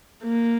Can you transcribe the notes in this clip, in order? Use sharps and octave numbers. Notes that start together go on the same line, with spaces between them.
A#3